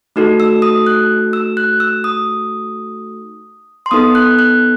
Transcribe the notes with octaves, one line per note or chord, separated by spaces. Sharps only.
A3 D#4 F#4 A4
E6
D#6
F#6
E6
F#6
E6
D#6
C6
B3 D#4 A4 D#6
F#6
F#6